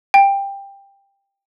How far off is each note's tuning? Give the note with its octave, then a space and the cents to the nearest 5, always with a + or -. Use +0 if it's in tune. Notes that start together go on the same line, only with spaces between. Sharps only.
G5 +15